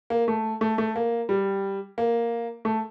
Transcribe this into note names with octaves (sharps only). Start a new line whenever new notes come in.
A#3
A3
A3
A3
A#3
G3
A#3
A3